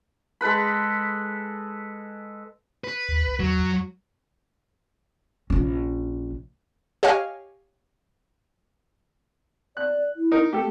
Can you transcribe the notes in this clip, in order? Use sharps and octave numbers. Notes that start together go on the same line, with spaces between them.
G#3 A4 B4 B5
B4
D#2
C2
E2 F#3
F2
A#1 C#4
G4 C#5 D#5 F5 G#5 F6
D5 F#6
E4
D#4 A#4
A3 G4 A4